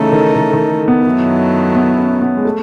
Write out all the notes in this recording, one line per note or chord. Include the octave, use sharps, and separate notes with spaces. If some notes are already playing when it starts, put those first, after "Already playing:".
Already playing: C#3 E3 A3 D#4 A4
D#3
D#3
D#3
B3
F#2 D#3 F#3 A3 E4
B3
C#4
B3
G#3
A3